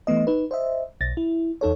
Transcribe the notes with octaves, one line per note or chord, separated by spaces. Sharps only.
E3 A3 B3 D#5
D#4 B4
C5 D#5 E5
B1 A6 A#6
E4
E2 D#4 A4 C#5